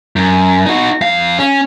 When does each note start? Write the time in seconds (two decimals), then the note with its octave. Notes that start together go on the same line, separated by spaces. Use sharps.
0.16 F#2
0.66 D#4 F#4
1.02 F2 F5
1.39 C#4